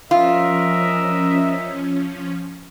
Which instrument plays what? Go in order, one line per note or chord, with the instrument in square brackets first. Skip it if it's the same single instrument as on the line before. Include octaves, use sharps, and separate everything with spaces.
[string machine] F3 C#4 [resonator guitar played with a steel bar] F4 [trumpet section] A#4 D#5 E5